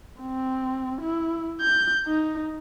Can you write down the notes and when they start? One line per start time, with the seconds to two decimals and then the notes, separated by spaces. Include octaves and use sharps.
0.21 C4
1.01 E4
1.61 G6
2.07 D#4